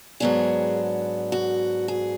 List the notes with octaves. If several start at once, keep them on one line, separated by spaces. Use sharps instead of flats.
G#2 F#3 B3 D4 G#4
F#4
G#4